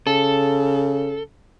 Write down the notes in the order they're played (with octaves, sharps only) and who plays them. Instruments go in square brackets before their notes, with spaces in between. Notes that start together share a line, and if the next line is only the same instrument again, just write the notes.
[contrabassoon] C#3 [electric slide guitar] A4